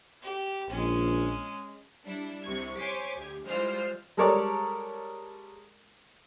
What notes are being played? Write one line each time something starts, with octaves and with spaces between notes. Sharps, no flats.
G4
A#1 G#3 C#4
G3 D4 E4
C2 C3 C#6 G#6
C5 C#5 G#5 C6 D6 B6
D2 G4 G#6
E3 G3 G#3 F4 C5 F6
G3 G#3 A4 A#4 C#5 D5